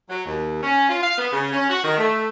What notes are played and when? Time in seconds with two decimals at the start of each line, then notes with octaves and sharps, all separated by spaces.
0.10 F#3
0.26 D#2
0.63 C#4
0.89 F4
1.03 F5
1.18 B3
1.32 C#3
1.53 C#4
1.70 F#4
1.84 D#3
1.98 A3